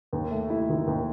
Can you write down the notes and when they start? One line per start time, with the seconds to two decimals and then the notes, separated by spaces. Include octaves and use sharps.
0.13 D#2
0.31 A3
0.50 E4
0.69 D#3
0.87 D#2